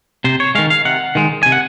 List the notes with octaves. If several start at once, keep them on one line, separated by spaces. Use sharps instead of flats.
C3 C5
C#5
D#3 G#3 F5
F5
C3 F#5
D#3 G#3
C3 G#5
F#5